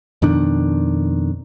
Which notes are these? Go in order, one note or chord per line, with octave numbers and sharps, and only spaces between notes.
F2 B2 D#3 D4